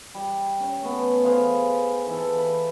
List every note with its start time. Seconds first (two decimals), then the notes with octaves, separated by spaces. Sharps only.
0.14 G3
0.60 C#4
0.83 A3 B3
1.24 G#4 B4 C5 F5
2.07 E3 A4
2.37 A5 B5